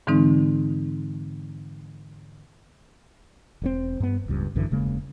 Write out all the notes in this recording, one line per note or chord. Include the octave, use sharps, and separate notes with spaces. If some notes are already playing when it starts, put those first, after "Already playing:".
G#2 D3 E3 G#3 C4 D#4
E1 A#2 C4
G2 B3
D1 C#2 G2
A1 F#2 D3 E3
E1 C#3 G#3 A#3